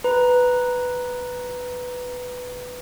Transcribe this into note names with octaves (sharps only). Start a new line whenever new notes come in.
B4 A#5